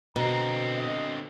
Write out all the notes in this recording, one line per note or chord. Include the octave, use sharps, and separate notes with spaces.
B2 D3 C4 A#5
D#5